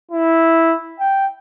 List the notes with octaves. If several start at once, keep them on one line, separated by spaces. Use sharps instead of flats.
E4
G5